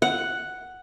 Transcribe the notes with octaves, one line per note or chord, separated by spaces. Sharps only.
F#5